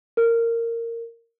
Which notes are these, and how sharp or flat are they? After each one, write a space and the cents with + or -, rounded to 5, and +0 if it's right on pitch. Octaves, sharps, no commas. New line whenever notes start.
A#4 -15